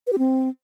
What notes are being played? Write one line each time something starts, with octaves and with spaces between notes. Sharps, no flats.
B4
G4
C4